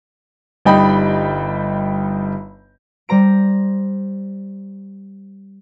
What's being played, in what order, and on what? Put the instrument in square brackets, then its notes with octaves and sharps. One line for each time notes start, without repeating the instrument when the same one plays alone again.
[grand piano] G1 G3 D#4 D#5 G5 B5
[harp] G3 C5 A#5 D7